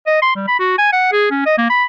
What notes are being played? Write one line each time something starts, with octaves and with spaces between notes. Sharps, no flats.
D#5
C6
G3
B5
F#4
G#5
F#5
G#4
C#4
D#5
A#3
B5